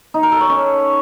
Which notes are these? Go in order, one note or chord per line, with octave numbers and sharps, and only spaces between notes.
D#4
A#4
A4
C#5
C#4